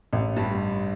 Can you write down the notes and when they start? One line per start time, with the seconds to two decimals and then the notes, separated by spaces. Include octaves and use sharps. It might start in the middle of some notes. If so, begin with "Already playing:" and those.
0.13 A1
0.36 G2 G3